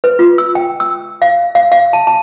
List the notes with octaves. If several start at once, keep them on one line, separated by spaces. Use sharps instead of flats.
B4
F4
E6
G5
E6
F5
F5
F5
A5
A5